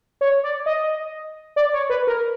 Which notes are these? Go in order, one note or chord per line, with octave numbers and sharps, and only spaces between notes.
C#5
D5
D#5
D5
C#5
B4
A#4